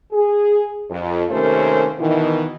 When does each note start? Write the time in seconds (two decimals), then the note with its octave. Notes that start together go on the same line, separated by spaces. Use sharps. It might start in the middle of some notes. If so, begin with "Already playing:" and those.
0.12 G#4
0.90 F2
1.30 D#2 C3 A3 C#4 A#4 C5
1.99 B2 D#3 E3